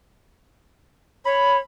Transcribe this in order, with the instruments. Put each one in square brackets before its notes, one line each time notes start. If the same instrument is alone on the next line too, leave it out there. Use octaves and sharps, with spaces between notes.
[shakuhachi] C#5 [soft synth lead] B5